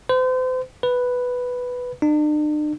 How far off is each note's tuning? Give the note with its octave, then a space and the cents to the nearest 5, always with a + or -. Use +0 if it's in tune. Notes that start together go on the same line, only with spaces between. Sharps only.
C5 -40
B4 +0
D4 +45